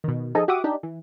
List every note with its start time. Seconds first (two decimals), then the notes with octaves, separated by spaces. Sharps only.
0.04 B2 D#3
0.35 F3 D#4 G#4 A4 D#5
0.48 F#4 G4 E5 F#5 D6 D#6
0.64 D4 D#4 G4
0.83 E3